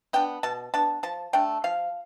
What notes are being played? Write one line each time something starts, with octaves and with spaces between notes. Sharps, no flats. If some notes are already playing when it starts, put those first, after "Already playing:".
B3 D4 G5
B2 A5
B3 D4 A5
F3 A5
A3 D4 G5
F3 F5